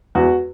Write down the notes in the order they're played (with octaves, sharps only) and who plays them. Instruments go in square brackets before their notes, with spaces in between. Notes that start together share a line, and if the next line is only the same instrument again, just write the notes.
[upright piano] E2 F#4